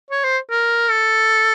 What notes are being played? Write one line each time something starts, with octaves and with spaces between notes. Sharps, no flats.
C#5
C5
A#4
A4